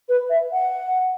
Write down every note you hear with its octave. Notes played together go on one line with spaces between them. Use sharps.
B4
E5
F#5